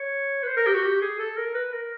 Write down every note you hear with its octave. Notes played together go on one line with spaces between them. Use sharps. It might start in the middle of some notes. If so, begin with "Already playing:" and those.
Already playing: C#5
B4
C5
A#4
G4
F#4
G4
G#4
A4
A#4
B4
A#4